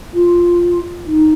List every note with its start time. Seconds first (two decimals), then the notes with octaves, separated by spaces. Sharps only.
0.14 F4
1.06 D#4